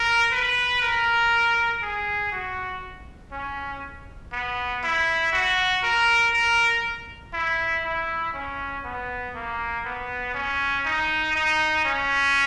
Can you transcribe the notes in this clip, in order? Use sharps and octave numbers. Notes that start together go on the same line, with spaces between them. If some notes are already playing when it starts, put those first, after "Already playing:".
Already playing: A#4
B4
A#4
G#4
F#4
C#4
B3
E4
F#4
A#4
A#4
E4
E4
C#4
B3
A#3
B3
C#4
D#4
D#4
C#4